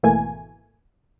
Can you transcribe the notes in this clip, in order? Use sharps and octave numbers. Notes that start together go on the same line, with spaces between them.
G#1 B2 E3 A3 A#3 G#5